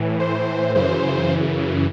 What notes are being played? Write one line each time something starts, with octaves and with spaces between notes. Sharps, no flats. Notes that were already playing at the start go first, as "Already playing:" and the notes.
Already playing: A2 E3
C5
F#2 C#3 E3 C5